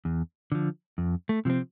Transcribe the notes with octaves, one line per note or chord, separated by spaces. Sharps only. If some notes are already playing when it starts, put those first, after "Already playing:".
E2
D3 F3
F2
A3
C3 F3 C4